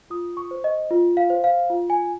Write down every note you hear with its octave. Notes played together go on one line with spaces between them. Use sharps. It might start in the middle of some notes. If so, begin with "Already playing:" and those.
F4 D#6
C#6
C5
D#5
F4
F5
C5
F5
F4
G#5